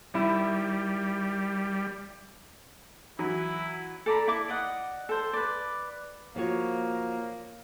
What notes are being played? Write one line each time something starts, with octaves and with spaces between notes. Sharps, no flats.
D#3 G3 E4
E3 F#3 E4
A4 D5 A#5 B5
E4 D6
D5 D#5 F#5
A4 C5
B4 D5
F3 A#3 F#4 C#5